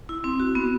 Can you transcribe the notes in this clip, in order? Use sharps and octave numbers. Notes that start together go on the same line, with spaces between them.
E4
C4
F#4
B3